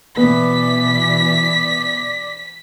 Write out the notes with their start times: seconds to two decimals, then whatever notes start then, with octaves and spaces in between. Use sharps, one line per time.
0.17 B2 E3 B3 D5 B6